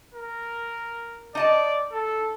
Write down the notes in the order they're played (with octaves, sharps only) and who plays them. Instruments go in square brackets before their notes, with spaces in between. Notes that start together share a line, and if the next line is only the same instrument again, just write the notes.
[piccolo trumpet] A#4
[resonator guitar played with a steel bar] D#4 D#5 A5 [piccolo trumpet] D5
[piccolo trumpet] A4